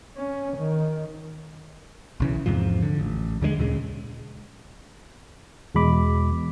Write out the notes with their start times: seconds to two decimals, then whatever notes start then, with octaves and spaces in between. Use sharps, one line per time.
0.17 C#4
0.58 D#3
2.20 B1 C#3 E3
2.46 E2 G#2 C3 F3
2.82 D3
3.00 A1
3.41 D#2 D3 E3 G#3
3.59 D2 A#2 C#3 G#3
5.75 E2 B2 G#3 B5 D6